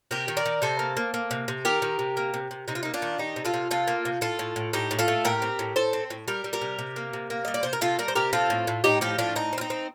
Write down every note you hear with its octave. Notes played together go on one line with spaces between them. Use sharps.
C3 G4 A#4
D#3
A#4 D5
D#3
C3 A4 C5
A#3
A#3
A#3
C3
C3
D#3 G4 A#4
D#3
C3
A#3
C3
C3
C3 D#4
F4
A#3 D#4
D4 F4
D#3
D#3 D#4 G4
C3
F4 A4
C3
C3 F4 A4
A#3
C3
A2 F4 A4
A2
A2
A2 D#4 G4
A2
F4 A4
A3
A2 G4 A#4
C4
A2
A2 A4 C5
C4
A2
G3 G4 A#4
G3
G4 A#4
C3
C3
A#3
C3
A#3
G3 D#5
D5
C3 C5
A#4
C3 F4 A4
G3 A#4 D5
C5
C3 G4 A#4
C4 F4 A4
A2
A2
A2 D#4 G4
F3 D#4 G4
A2 D4 F4
C4 D#4
C4
F4
D#4
C4